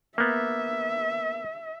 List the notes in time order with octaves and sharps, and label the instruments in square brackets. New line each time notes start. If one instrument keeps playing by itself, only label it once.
[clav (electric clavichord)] A#3 B3 [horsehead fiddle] E5